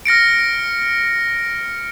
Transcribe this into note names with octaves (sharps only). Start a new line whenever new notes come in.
F6 A#6 C#7 D7